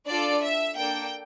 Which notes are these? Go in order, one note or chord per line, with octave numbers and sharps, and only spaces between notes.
D4 F4 A4 D5
E5
A#3 D4 A4 G5